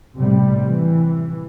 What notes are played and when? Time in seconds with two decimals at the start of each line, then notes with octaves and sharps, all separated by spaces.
0.16 A2 C3 G3
0.66 E3